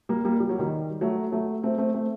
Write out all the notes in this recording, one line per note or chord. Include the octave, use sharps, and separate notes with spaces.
G3 A#3
G3 A#3
G3
F#3
D#3 G3
F#3 A3
F#3 A3
A3 C4
A3 C4
A3 C4